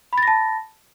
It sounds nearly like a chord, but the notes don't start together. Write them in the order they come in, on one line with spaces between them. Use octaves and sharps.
B5 A6 A#6 A5